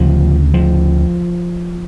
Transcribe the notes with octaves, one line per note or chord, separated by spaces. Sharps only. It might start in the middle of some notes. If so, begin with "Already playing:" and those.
Already playing: D2 C#3 F3
F3